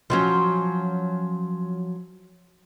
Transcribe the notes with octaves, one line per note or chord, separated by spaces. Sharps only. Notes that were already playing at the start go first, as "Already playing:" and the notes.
F3 F#3 C#4